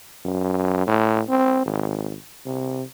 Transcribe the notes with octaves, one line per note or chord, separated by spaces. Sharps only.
F#2
A2
C4
G#1
C3